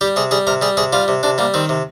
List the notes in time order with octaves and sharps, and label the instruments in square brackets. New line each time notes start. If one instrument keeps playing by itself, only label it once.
[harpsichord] G3 G4
C3 G#4
G3 G#4
C3 A#4
G3 G#4
C3 G#4
G3 F4
C3
C3 D4
G3 A#3
D#3 C4
C3